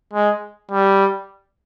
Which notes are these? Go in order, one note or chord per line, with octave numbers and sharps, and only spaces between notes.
G#3
G3